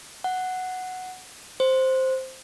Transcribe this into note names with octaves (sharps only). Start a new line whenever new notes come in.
F#5
C5